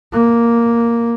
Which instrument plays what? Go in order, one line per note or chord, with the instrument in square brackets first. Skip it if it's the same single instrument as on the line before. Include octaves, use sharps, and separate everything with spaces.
[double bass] A#3